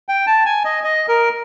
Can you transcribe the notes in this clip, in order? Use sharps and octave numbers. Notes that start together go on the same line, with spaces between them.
G5
A5
G#5
D#5
D#5
A#4